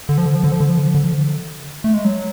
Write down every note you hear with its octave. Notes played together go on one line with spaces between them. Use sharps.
D3
F3
D3
F3
D3
F3
D3
F3
D3
F3
D3
F3
D3
A3
G#3
F#3